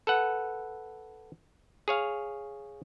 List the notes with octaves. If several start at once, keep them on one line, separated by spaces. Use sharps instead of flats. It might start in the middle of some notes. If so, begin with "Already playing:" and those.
A4 B4 F#5
G#4 C#5 F5